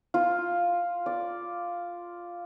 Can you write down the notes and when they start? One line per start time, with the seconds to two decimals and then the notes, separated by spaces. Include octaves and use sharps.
0.14 F4
1.06 D5